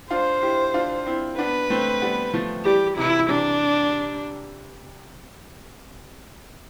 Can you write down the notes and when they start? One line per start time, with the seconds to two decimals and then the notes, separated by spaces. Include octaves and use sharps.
0.11 D4 F4 C5
0.42 E4 G4
0.74 D4 F4
1.06 C4 E4
1.38 B3 D4 B4
1.70 A3 C4
2.02 G3 B3
2.34 F3 A3
2.65 E3 G3 G4
2.97 C3 E3 E4
3.29 C3 E3 D4